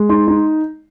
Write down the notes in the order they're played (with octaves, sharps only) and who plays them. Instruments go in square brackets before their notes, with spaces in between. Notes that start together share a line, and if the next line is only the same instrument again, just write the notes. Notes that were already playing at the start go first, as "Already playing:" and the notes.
Already playing: [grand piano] G#3
D#4 C6
D#4